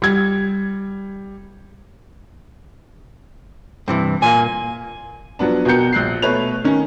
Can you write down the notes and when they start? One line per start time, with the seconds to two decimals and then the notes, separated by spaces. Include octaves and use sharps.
0.02 G3 G#6
3.88 G2 C3 E3
4.22 A#2 A#3 G#5
5.39 F3 F#3 B3 D4
5.65 B2 F#4 A#4 G5 G6 C#7
5.93 A#1 F#6 C7
6.22 B2 A3 B4 C#5 F7
6.64 D#3 C#4